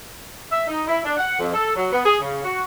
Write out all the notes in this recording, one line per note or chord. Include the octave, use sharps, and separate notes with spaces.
E5
D#4
E4
D4
F#5
F2
A4
F#3
B3
G#4
C#3
F#4